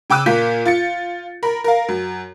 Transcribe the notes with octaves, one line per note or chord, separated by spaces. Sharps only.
C#3 G5 D6 E6 F#6 D#7
A#2 A#3 F4 G6 B6
F4 A6 C#7
A#4 B5
A#4 F5
F#2